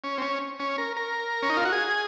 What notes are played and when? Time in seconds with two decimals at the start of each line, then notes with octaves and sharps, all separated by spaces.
0.04 C#4
0.18 C4
0.22 C#4
0.60 C#4
0.78 A#4
0.97 A#4
1.42 C#4
1.50 D#4
1.57 F4
1.65 F#4
1.72 G#4